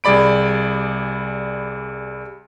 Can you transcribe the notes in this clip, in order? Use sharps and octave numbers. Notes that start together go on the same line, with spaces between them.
C2 G3 G#4 D5 B5 D7